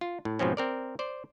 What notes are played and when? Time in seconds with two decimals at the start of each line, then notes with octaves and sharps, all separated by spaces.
0.01 F4
0.25 A2
0.39 G#2 B2 F3 C4 C#4
0.57 C4 A#4 D5
0.99 C5 D5